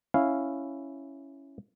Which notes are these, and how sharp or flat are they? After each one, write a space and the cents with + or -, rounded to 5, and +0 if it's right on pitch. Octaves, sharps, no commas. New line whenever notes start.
C#4 +0 E4 +0 F5 +0